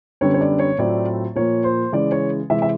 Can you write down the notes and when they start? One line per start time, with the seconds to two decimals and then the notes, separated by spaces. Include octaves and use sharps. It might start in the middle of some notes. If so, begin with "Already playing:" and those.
0.21 F#2 D3 G3 B3 C#5
0.34 C#5
0.41 D5
0.59 C#5
0.78 A2 F#3 A3 C4 F4 D5
1.36 A#2 F3 A#3 C#5
1.64 C5
1.92 C#3 E3 G#3 D5
2.12 C#5
2.50 C3 E3 G#3 E5
2.62 E5